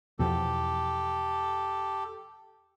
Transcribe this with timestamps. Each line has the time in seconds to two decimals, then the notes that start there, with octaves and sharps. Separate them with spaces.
0.19 E2 B2 F3 G4 A4